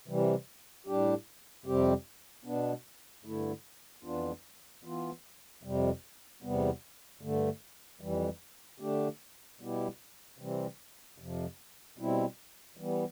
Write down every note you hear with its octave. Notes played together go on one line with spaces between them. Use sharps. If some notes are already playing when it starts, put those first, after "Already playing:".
C3 E3 G3
A2 G3 D4 G4
F2 C3 G3 C4 G4
B2 B3 D4
G2 D3 A3 E4
F2 E3 B3 D4 F4
E3 B3 F4
F2 C3 G3
E2 C3 G3 B3
G2 D3 A3
F2 E3 G3
D3 A3 D4 G4
B2 G3 B3 E4 G4
C3 E3 G3 C4
F2 C3 F3
B2 G3 C4 E4
E3 G3 B3